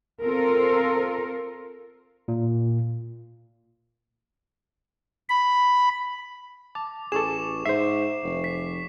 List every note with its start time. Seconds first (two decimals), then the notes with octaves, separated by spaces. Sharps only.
0.22 C4 F4 A4 A#4
2.28 A#2
5.29 B5
6.75 A5 D6
7.12 A1 G#4 A4 C#6 D6 E7
7.66 G#2 C5 E5 C7
8.23 F1
8.44 B6